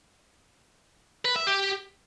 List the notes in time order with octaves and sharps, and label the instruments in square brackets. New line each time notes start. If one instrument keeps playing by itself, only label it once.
[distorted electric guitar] B4
E5
G4